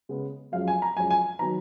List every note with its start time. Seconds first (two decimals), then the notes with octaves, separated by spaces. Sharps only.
0.09 C#3 G#3 B3
0.52 F#2 F3 G#3 C#4 F5
0.68 G#5
0.82 A#5
0.97 F#2 F3 G#3 C#4 G#5
1.10 G#5
1.39 D#3 F#3 B3 D#4 A#5